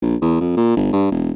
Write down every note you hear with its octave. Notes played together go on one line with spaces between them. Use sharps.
A#1
E2
F2
A#2
G1
G2
E1